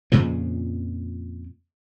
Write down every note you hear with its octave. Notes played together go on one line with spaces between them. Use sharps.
F2 A#2 C#3 F3